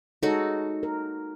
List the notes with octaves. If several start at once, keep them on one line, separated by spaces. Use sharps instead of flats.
G#3 D#4 F#4 A4 C#5
A#4